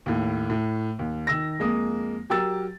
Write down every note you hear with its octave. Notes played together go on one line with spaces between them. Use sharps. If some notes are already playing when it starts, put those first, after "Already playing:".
D#2 A2
A2
D#2
D#3 E6 A#6
F2 G#3 A#3 D#6
F#3 G4 A#4 E6 A6